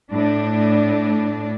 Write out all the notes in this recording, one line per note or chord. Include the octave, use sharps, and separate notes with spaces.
A2 D4